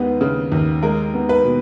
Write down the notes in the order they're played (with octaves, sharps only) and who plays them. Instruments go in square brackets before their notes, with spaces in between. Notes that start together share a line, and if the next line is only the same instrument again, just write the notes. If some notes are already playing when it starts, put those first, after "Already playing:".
Already playing: [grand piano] D#2 G#3 B3
C#3
D#2
G#3 A#4
B3
B4
B2